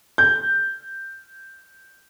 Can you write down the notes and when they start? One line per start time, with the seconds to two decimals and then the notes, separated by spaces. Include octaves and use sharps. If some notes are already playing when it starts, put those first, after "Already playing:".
0.18 G6